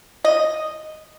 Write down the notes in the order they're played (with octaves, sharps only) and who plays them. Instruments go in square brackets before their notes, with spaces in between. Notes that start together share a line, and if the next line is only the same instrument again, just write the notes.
[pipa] D#5